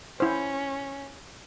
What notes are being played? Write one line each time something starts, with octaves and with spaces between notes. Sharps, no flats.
C#4 E4 C5